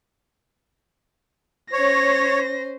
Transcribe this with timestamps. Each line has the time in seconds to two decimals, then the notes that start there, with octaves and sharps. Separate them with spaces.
1.73 C#4 C5 C#5 A#6